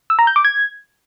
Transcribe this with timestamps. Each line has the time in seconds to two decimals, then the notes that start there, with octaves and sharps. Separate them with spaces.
0.10 E6
0.19 A#5
0.27 G6
0.36 D6
0.45 G#6